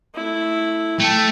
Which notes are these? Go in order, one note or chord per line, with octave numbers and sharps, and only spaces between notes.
A3 E4
A3 G5 A5